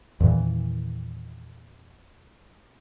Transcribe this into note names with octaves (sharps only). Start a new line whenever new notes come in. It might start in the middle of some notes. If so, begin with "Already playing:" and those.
E2 A#2 D#3 E3